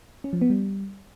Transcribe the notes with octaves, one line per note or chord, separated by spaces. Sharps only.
C#4
F3
B3
G3